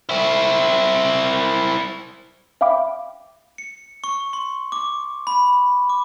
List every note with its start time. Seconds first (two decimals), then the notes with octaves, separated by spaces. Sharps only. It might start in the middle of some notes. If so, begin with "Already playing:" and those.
0.09 C4 E4
2.61 E5 F5 G5 B5 D6
3.58 C#7
4.04 C#6
4.33 C6
4.72 D6
5.27 B5
5.89 D6